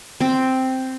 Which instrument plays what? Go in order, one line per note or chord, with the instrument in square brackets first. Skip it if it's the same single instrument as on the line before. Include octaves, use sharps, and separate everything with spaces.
[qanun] C4